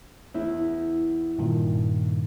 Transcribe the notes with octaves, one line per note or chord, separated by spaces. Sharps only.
E2 E4
G2 A#2 D#3